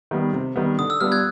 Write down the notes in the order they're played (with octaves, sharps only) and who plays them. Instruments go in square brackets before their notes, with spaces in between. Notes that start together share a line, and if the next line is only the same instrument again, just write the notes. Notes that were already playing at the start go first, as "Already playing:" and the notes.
[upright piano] D#3 G3 B3
C3
D#3 G3 B3
[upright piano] D3 [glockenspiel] D#6
[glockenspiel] E6
[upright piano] G3 B3 D4 F4 [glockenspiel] F6
[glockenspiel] F#6 G#6